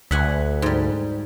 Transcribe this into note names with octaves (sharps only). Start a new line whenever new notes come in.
D2 E5 F#5 G#5
G#2 G3